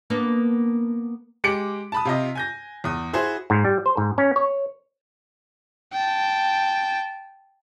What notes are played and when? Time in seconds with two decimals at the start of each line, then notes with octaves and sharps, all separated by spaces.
0.10 A#3 B3 D4
1.44 G#3 G4 D6 C#7 D7 F#7
1.92 A5 B5 D#6
2.05 C3 F4 D#5
2.35 G#5 G6 A#6
2.84 E2 D#6
3.13 E4 F#4 G#4 C5
3.50 G#2
3.65 G3
3.86 C5
3.97 G#2
4.18 C#4
4.36 C#5
5.93 G5 A5